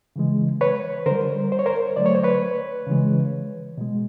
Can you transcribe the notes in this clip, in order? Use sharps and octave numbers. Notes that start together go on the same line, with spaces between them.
C#3 E3 G#3
B4 C#5
D3 G3 A#4 C5
C5
C#5
A#4 C5
D3 F#3 A3 D5
C#5
C5
B4 C#5
C#3 E3 G#3
B2 G#3